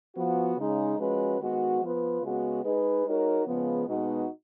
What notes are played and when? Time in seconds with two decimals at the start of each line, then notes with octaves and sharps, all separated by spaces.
0.15 F3 B3 F#4
0.57 C#3 G#3 D#4
0.98 F3 G#3 C#4 F#4 B4
1.39 D#3 G#3 B3 F#4
1.81 F3 B3 F4 B4
2.22 C#3 G#3 B3 F#4
2.64 G#3 D#4 G#4 B4
3.05 G#3 D#4 F#4 A#4 C#5
3.46 C#3 F3 G#3 B3
3.87 B2 G#3 B3 D#4 F#4